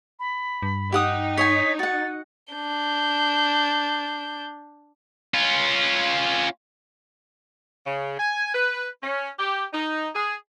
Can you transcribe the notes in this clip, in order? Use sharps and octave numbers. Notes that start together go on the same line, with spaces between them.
B5
G2
D#4 G4 F#5 D#6
C#5 D#5 G#5 B6
F#4 F#5 A6
D4 G6
C#4 F4
C#3
G#5
B4
C#4
G4
D#4
G#4